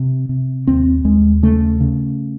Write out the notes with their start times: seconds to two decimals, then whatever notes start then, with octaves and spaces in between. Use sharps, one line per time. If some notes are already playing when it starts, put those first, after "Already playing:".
Already playing: C3
0.29 C3
0.67 D#2 C4
1.05 D#2 G#3
1.43 C#3 A3
1.80 C#3